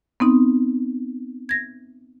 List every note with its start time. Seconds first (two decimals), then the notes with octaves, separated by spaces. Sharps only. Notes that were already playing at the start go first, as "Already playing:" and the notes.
0.20 B3 C4 D#4
1.49 G#6 A#6